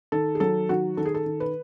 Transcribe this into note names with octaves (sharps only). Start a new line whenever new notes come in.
D#3 A4
G#4
F#3 A4
D#3 F#4
D#3 A4
G#4
A4
D#3
B4